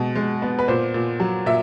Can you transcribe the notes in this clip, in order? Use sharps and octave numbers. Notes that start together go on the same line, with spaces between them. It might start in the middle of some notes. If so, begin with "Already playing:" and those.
Already playing: B2 G#3
G#3
B3
B4
A#2 C5
A#2
F#3
A#2 E5